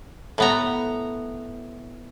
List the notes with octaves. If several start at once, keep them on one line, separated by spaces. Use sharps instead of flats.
A2 B3 A#5